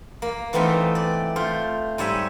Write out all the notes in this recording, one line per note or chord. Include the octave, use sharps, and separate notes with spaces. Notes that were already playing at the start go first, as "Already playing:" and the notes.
A#3
E3 A3 B3 C4 D#4 F4
D5
A3 F4 C5
G#2 G3 C#5 E5 G#5